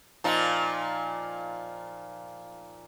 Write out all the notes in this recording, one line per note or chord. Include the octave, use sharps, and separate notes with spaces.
A#2 F3 D#4